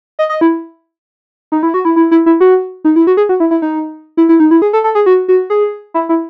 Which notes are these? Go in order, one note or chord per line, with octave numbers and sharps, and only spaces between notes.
D#5
D#5
E4
D#4
E4
F#4
E4
E4
E4
E4
F#4
D#4
E4
F#4
G#4
F#4
E4
E4
D#4
E4
E4
D#4
E4
G#4
A4
A4
G#4
F#4
F#4
G#4
E4
E4